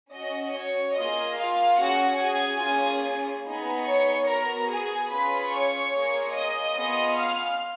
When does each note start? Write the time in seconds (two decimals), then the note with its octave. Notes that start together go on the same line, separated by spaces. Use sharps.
0.13 C#4 F#4 D#5
0.55 C#5
0.97 A#3 F4 G#4 D#5
1.37 F4 F5
1.80 C#4 F#4 G#4 F#5
2.20 G#4 G#5
2.62 A#3 C#4 F4 G#4
3.46 B3 D#4 G#4
3.87 C#5 C#6
4.29 B3 F#4 A#4 A#5
4.70 G#4 G#5
5.11 C#4 F4 G#4 B4 B5
5.53 C#5 C#6
5.94 A#3 F4 G#4
6.36 D#5 D#6
6.77 B3 F4 G#4 D#5 D#6
7.19 F5 F6